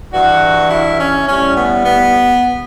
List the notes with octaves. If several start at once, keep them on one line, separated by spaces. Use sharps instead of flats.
G2 E3 G3 F#4
E4
C#4
A2 G3 C#4
B3
B3